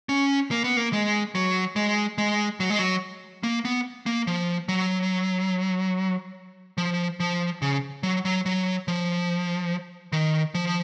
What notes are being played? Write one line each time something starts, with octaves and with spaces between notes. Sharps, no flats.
C#4
A#3
B3
A#3
G#3
F#3
G#3
G#3
F#3
G#3
F#3
A#3
B3
A#3
F3
F#3
F3
F3
C#3
F#3
F#3
F#3
F3
D#3
F3